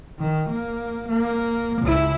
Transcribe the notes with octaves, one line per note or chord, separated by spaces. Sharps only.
D#3
A#3
A#3
C#2 E4